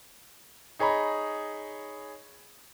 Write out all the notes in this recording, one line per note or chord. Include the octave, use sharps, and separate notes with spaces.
D#4 G#4 C#5 A#5 B5